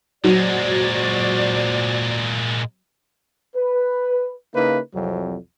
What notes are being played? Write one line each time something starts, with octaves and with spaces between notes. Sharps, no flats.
A#2 F#3 G#3 F#4 C5 D5
B4
C#3 A#3 D#4 E4 B4
C2 F2 F#3